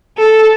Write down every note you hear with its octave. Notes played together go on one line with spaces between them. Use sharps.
A4